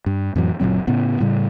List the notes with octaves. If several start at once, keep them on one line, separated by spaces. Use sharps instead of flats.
G2
F2 A2 E3 F#3
F#1 A#2 F#3 C4
A2 C#3 B3
A2 C#3 G3